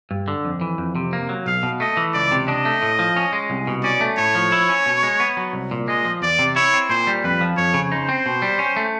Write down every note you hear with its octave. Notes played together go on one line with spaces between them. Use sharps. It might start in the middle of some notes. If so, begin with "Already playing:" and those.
G2
D3
F2
E3
F2
C3
A#3
F#3
B1 F5
B2
A3 D#5
E3
C#2 D5
C3
D4 D#5
A3
A2
F3
C#4
G#3
C2
B2
C#4 D5
A3
A2 C#5
F3
E4
C#4
B2
G#3
B3
F#3
C2
A#2
G#3 D#5
F3
E2 D5
C3
E4 C#5
C4
A#2 C5
G3
F2 B4
F3
F2 C#5
C#3
D#4 C5
C4
B2
G3
C#4
A3